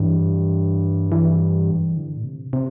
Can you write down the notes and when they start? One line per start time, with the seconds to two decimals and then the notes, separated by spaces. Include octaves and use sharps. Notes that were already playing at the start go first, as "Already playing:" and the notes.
Already playing: G2 E3
1.12 E3
1.97 D3
2.17 A2
2.24 C3
2.53 C3